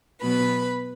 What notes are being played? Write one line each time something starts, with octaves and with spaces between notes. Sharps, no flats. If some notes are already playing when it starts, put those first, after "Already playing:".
B2 F#3 B3 B4 B5